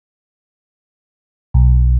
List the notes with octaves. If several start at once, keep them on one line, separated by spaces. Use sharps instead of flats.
B1